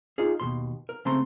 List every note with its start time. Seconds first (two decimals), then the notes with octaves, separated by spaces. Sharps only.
0.18 D#4 F4 G#4
0.40 D#2 B2 C6
0.89 A#4
1.05 C#3 A3 C4 A#5 C6